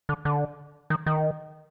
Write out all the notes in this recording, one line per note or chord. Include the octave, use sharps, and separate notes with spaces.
D3
D3
D#3
D#3